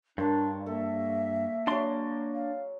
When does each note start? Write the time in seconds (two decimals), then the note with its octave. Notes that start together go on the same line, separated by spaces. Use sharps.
0.18 G2 D4 A#4 C#5 A5 C6
0.66 A#3 A4 E5
1.67 F#3 G#3 D4 D5 C6
2.34 F5